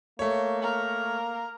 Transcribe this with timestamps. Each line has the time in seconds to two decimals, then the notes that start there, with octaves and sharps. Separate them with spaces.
0.19 A3 A#3 C#5
0.62 A#3 A#4